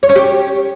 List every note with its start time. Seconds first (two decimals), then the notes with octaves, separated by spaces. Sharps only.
0.03 C#5
0.09 C#4
0.16 G4